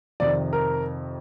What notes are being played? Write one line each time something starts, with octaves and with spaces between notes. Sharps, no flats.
F2 C3 D#3 D5
A#4